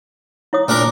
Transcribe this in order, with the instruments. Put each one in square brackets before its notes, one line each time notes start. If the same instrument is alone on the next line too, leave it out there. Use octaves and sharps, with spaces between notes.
[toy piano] E4 C#5 D#6
[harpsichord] A#2 D4 A#4